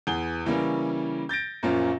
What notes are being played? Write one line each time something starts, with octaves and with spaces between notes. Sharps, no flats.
E2 G#4 G7
C#3 E3 G3 A#3 C#4
G6 A6 A#6 D7
F#2 A#2 F3 A#3 C#4 F4